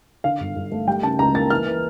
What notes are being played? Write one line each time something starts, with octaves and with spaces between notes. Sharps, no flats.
D3 F5
G1
G1
A3
G3 G5
C#3 A5
C#2 A#5
A#3 A6
E3 F6
E3